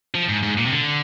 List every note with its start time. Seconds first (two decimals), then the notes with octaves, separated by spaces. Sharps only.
0.15 F3
0.29 G#2
0.43 G#2
0.58 A#2
0.66 C3
0.72 D3